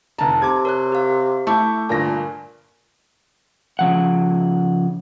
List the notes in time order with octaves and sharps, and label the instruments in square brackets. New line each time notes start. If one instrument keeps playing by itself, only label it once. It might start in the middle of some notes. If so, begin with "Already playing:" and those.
[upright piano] F1 A#5 [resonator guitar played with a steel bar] A5
[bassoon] C3 [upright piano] D6 G#6
[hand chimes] A#4 C#5 F#6
G4 F5
[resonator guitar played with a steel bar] A3 [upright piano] E4 [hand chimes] C#6 D6 G6
[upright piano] G1 G2 A#6 [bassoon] A#2 [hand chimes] G#5
[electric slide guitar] C#3 F3 F#5